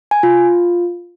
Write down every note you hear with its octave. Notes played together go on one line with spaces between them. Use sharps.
G#5
F4